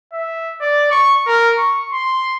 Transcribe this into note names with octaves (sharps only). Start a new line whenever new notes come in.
E5
D5
C#6
A#4
C#6
C6